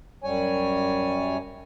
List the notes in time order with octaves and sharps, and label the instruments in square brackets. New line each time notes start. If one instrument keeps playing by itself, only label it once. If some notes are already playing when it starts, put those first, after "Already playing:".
[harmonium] F#2 G3 C#5 G#5